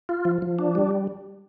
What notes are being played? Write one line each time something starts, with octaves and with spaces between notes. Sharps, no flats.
F4
F3
F3
D4
G3